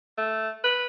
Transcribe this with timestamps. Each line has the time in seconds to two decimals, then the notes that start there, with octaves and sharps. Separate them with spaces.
0.18 A3
0.64 B4